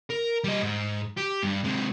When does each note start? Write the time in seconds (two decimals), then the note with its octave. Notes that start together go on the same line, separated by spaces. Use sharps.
0.10 A#4
0.44 G3 D#5
0.63 G#2
1.17 G4
1.44 G2
1.64 C3 G#3